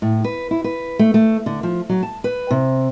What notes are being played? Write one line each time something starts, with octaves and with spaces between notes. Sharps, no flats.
A2
B4
E4
B4
A3
A3
D3
F3
F#3
A5
B4
C3